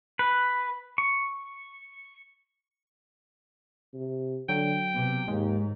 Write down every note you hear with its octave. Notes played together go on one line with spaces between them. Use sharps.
B4
C#6
C3
D3 F#3 G5
C3 B3
D#2 G#2 G#3